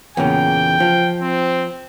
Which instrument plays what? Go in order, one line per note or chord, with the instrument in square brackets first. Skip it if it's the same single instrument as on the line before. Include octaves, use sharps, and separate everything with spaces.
[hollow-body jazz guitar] E2 A#2 C#3 [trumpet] G5
[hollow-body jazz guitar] F3
[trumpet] C4